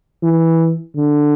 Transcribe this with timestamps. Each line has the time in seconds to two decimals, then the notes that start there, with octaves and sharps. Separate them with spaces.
0.23 E3
0.97 D3